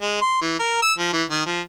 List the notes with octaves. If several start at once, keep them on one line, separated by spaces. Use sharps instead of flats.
G#3
C6
E3
A#4
E6
F3
E3
D#3
F3